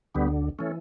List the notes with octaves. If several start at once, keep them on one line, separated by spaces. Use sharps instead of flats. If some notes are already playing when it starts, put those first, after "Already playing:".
D2 D3 G3 B3
E3 A3 C#4